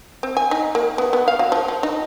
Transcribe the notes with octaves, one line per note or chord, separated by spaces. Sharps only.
C4
G#5
D#4
A#3
B3
B3
F5
F#3
F3
F3
D#4